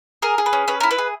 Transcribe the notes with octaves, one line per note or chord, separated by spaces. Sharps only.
G#4 A#4
G#4
B4
C#4
C#4 B4
E4 A#4
B4
G#4